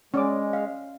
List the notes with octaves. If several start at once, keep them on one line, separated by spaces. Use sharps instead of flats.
G#3 C#4 D5 D6
F5